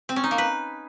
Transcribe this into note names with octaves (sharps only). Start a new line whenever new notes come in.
C4
C#4
D#4
A#3
B4